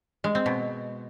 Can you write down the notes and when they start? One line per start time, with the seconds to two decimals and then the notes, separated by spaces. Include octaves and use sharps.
0.24 G#3
0.35 C4
0.46 B2